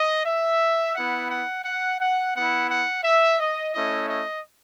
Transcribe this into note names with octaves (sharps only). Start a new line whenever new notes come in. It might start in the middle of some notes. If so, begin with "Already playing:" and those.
Already playing: D#5
E5
B3 E4 F#5
F#5
F#5
F#5
B3 E4 F#5
F#5
E5
D#5
A3 C#4 E4 D#5
D#5